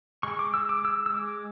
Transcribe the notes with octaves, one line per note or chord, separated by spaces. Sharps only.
G#3 C#6
D6
G#3 E6
D6
G#3 E6
E6
G#3 D6